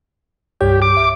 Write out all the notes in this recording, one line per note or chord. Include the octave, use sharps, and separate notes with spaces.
C2 G2 G4 C#5
D6
E5